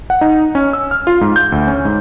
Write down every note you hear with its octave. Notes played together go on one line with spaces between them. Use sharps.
F#5
D#4
C#4
E6
F6
F4
G#2
G6
D2
C#4
G#2